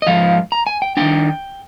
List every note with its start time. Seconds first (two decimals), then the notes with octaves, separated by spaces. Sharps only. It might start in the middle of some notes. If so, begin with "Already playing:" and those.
0.02 D#5
0.07 G#2 F3 F5
0.52 A#5
0.67 G#5
0.82 G5
0.97 D#3 A#3 D4 G5